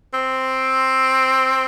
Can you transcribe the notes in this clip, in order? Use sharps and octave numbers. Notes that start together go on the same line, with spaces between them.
C4